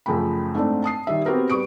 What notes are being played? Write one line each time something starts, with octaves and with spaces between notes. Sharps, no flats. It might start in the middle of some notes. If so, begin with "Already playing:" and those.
F#2 C#3 F3 A3 G5 B5
G#2 A3 C4 D4
A5 D#6 C7
D#3 G3 E5
B3 C4 F#4 G4 A#4 B4
G3 B4 C#6 D#6 D7